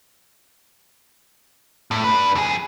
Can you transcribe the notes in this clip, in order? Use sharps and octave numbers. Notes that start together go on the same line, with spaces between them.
A2
D4 B4
F2 G#4